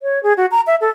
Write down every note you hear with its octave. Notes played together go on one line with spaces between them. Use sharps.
C#5
G#4
F#4
A#5
E5
A4